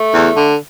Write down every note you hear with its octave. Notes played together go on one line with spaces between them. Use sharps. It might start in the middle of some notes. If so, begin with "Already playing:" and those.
Already playing: A3
E2
D3